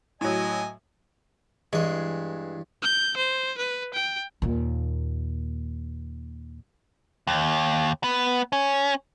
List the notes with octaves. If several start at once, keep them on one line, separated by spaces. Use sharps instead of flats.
A2 F#3 D#5 G#5
G2 E3 G#3 C#5
G6
C5
B4
G5
D#2 A#2
D#2
B3
C#4